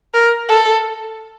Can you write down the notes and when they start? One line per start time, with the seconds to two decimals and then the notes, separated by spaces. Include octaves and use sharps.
0.14 A#4
0.49 A4